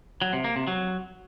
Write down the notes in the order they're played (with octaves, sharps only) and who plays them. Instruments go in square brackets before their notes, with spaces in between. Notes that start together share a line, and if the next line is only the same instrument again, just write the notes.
[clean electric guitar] F#3
C3
A#3
C3
F#3